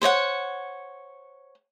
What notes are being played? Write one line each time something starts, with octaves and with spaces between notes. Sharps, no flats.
C5 C#5 D#5 F#5